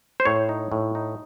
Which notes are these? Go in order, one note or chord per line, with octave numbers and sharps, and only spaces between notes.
C5
A2 C#5
D#4
A2
D#4